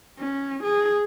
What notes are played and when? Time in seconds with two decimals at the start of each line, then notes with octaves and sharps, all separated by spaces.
0.19 C#4
0.64 G#4